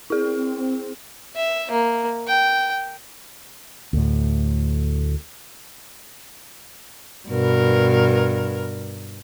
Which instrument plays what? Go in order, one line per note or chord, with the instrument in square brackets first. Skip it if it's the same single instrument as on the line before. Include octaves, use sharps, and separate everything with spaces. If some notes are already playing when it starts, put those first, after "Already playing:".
[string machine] C4 [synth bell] E4 G#4
[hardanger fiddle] E5
A#3
G5
[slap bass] D2 A2
[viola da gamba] G2 B2 A#4